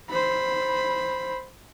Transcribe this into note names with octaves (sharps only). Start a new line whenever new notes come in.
C5 B5